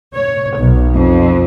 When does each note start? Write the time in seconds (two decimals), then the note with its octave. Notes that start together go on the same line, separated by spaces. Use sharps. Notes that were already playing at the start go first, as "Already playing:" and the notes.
0.15 C#5
0.58 B1
0.94 F2